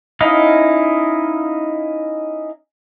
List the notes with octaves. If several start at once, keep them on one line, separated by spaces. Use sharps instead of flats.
C#4 D#4 E4 D#5 F5